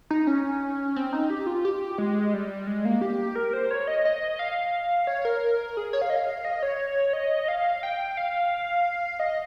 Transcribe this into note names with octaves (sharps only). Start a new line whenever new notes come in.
D#4
C#4
C4
D#4
G4
F4
G4
G#3
G3
G#3
A#3
G4
A#4
C5
C#5
D#5
D#5
F5
C#5
A#4
G#4
C#5
F5
D#5
F5
D#5
C#5
D#5
F5
G5
F5
D#5